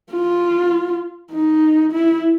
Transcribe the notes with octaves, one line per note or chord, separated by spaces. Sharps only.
F4
D#4
E4